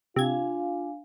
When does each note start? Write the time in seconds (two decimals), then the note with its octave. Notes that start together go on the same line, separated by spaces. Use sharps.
0.16 C3 D4 F4 F5 G#5 G#6